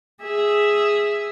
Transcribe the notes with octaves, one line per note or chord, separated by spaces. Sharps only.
G#4 E5